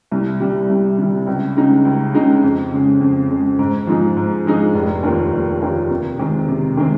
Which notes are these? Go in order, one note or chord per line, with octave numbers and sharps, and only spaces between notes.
C2
C3 G3
C2
C3 G3
C#2
C#3 G#3 D#4
C#2
C#3 G#3 D#4
F2
C#3 G#3
F2
C#3 G#3
G#2
F3 G#3 D#4 G#4
G#2
F3 G#3 D#4 G#4
F1
D#2 D#3 A#3 F4
F1
D#2 D#3 A#3 F4
C3
D#3 G#3 C4
C3
D#3 G#3 C4